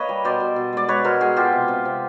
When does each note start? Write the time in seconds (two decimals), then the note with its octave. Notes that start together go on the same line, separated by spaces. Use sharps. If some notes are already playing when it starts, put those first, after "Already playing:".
Already playing: A#3 B4 C#5 D#5
0.09 G3
0.24 B2 C5 D5
0.40 B2
0.56 B2
0.73 G#3 D5
0.88 G#3 B4 C#5
1.04 B2 A#4 C5
1.20 G#3 F#4 G#4
1.37 B2 F4 G4
1.52 C3
1.68 C3
1.85 C3